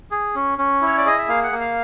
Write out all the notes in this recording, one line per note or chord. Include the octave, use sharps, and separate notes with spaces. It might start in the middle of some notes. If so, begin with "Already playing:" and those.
G#4
C#4
C#4
E4 C#5
D5
G#4 D#5
E5
A#3 F5
F#5
A#3
F5